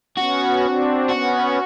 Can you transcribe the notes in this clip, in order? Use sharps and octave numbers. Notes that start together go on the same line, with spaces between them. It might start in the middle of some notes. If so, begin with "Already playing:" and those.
B3 C#4 F#4
C4 D4
B3 C#4 F#4